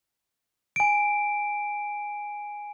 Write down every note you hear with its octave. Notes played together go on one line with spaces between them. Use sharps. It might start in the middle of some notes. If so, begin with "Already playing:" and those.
G#5 D7